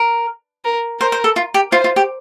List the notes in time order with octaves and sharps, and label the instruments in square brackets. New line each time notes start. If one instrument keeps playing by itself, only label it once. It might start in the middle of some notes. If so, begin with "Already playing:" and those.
Already playing: [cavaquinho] A#4
[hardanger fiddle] A#4
[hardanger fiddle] A#4 [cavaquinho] C5
[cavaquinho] C5
A4
F4
G4
[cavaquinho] F4 [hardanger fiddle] C5
[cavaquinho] F4
G4